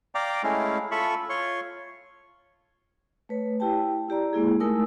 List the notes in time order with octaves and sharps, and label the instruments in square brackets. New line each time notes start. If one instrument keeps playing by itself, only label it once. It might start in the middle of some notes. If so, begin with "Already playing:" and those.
[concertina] D5 F5 G5 A#5 D6
G#3 A3 C#4 E4 F5
F4 A4 E5 B5 C#6
F4 C#5 C6 C#6
[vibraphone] A3 B4 C#5
E4 G4 G5 A5
E4 G4 D5 A#5
G#3 A#3 E4 G#4
A3 D#4 A#4 G#5 D#6 E6